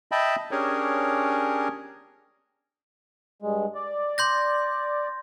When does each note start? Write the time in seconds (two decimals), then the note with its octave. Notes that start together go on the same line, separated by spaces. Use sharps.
0.12 D#5 E5 G5 A5 B5
0.51 C#4 D4 G4 G#4 A#4 C#5
3.42 G2 G#3
3.75 D5
4.18 C6 G6 A#6